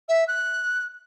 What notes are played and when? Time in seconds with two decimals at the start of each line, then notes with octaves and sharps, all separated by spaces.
0.09 E5
0.28 F#6